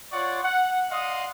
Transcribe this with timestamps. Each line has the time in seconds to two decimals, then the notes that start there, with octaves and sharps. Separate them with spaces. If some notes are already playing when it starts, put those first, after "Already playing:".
0.12 F4 C#5 D5 F#5 C6 C#6
0.43 F#5
0.90 D5 D#5 F5 F#5 C6 D#6